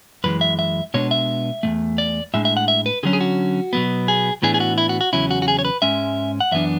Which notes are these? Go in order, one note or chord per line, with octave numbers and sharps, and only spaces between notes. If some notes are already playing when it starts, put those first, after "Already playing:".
F#2 E3 G#3 B4
E5
E5
B2 G#3 B3 D4 C#5
E5
E2 B2 A3
D5
A2 G#3 D4 E5
E5
F#5
E5
B4
D3 F#3 C#4 G#4
G#4
F#4
B2 F#3 B3
G#4
A2 E3 B3 D4 G#4
G#4
F#4
E4
F#4
F#4
E2 C#3 F#3 C#4 E4
F#4
F#4
G#4
C#5
B4
G#2 G#3 C#4 E5
F#5
F#2 E3 B3 D4 E5